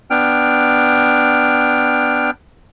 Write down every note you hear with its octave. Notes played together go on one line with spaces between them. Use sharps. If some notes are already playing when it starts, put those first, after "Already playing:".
B3 D4 G5 F6